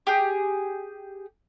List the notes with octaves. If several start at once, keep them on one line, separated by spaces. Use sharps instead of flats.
G4 G#4